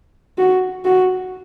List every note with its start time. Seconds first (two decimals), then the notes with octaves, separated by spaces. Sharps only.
0.38 F#4
0.85 F#4